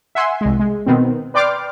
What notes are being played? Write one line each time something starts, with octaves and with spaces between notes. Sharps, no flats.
E5 F#5 G#5 C6
C2 G#3
G#3
B2 D#3 B3 C4
B4 D5 G5 C6 D6 F6